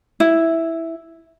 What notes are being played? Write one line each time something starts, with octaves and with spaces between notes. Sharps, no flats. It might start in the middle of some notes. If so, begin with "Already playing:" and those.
E4